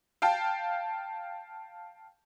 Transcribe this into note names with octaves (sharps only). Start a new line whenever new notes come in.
F5 G5 A5